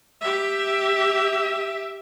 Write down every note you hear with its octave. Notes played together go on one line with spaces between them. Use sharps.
G4 E5